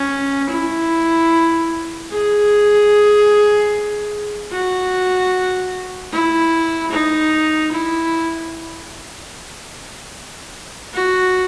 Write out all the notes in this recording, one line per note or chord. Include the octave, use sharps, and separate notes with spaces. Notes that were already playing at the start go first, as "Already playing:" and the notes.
Already playing: C#4
E4
G#4
F#4
E4
D#4
E4
F#4